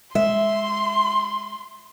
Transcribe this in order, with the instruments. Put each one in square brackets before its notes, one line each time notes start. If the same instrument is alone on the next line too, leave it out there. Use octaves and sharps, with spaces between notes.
[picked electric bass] G#3 [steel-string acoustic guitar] E5 [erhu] C6